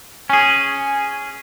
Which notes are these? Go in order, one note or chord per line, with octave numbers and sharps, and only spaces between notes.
C#4 G#4 G#5